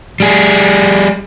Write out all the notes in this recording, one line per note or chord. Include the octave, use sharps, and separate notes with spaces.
G3 G#4